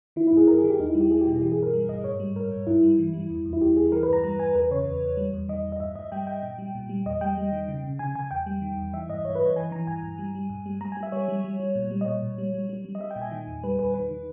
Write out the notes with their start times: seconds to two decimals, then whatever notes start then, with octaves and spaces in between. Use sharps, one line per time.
0.16 D#3 E4
0.27 E4
0.32 G2 G#4
0.47 G2 A#4
0.58 G#4
0.64 D#3
0.70 G4
0.79 E2 D#4
0.90 E4
0.95 G3
1.00 G4
1.11 G3 G#4
1.21 G4
1.27 B2
1.32 E4
1.42 E3 G4
1.52 G#4
1.58 G2 A#4
1.73 G3
1.89 G2 D#5
2.04 G#2 C#5
2.20 G3
2.36 G#2 A#4
2.51 G#2
2.67 G2 E4
2.83 G3
2.99 E3
3.14 G3
3.30 E2
3.46 E2
3.53 E4
3.61 E2 G4
3.77 E2 G#4
3.92 E3 A#4
4.03 B4
4.08 G2 A#5
4.24 G3 A#5
4.39 G2 G#5
4.55 E2 B4
4.71 C#3 C#5
4.86 E2
5.02 E2
5.17 G3
5.34 E2
5.49 D#3 D#5
5.65 E2
5.72 D#5
5.80 G2 E5
5.95 G2 D#5
6.12 G3 G5
6.27 G2 G5
6.43 A#2
6.58 G3
6.75 A#2
6.89 G3
7.06 E2 D#5
7.21 G3 G5
7.38 G3
7.52 D#3
7.68 C#3
7.84 C#3
7.99 C#3 G#5
8.15 C#3 G#5
8.31 E2 G5
8.46 G3
8.62 D#3
8.77 E2
8.93 E3 E5
9.09 G2 D#5
9.24 G2 C#5
9.35 B4
9.40 G2
9.46 C#5
9.56 E3 G#5
9.72 E3 A#5
9.87 G2 G#5
10.03 G2
10.19 G3
10.35 G3
10.50 G2
10.66 G3
10.81 G3 A#5
10.92 G#5
10.97 G3
11.03 E5
11.12 G3 C#5
11.28 G3
11.44 G3
11.60 G3
11.75 A#2
11.91 G3
12.01 D#5
12.06 A#2 C#5
12.23 A#2
12.38 G3
12.54 G3
12.69 G3
12.85 G3
12.95 D#5
13.00 G3 E5
13.11 G5
13.16 A#2
13.22 G#5
13.32 D#3
13.47 E2
13.63 G3 B4
13.79 E2 B4
13.94 D#3 B4
14.10 D#3